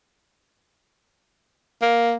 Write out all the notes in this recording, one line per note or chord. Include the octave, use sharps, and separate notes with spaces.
A#3